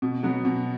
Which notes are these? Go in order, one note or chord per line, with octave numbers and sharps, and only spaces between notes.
B2
F#3 B3 F#4
B2